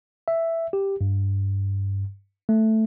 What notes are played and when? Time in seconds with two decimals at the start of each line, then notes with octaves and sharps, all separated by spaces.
0.28 E5
0.73 G4
1.01 G2
2.49 A3